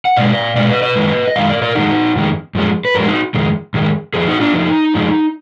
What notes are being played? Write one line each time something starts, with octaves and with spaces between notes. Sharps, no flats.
F#5
B2 G#3 D5 F5
B2 G#3 D5 F5
B4 D#5
B4 D#5
F#2 D#3 G#3
D#5
F#2 D#3 G#3 F5
A#4 D5
A#4 D5
F2 D#3 G#3 D#4 F#4
F2 D#3 G#3
F#2 F3 G#3
B4
F#2 F3 G#3 F#4 A#4
D#4 F#4
F2 D#3 G#3
F2 D#3 G#3
F2 F3 G#4
D#4 F#4
D4 F4
F2 F3 D#4
F2 F3 G#3